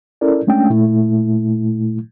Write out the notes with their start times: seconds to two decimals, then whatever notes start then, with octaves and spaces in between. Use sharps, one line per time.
0.21 C#4 E4 A4 A#4 D5
0.47 G#3 A3 C#4 D4 G5
0.70 A#2 A3 E4